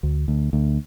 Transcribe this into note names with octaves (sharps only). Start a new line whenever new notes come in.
D2
D2
D2